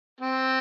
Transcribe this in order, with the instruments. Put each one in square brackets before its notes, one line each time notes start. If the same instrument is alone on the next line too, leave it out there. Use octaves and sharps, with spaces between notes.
[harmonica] C4